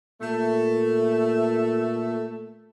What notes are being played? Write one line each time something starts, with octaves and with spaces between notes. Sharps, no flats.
A#2 A3